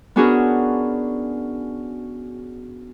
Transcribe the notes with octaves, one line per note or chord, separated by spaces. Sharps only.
B3 C#4 D4 F#4 G#4 A#4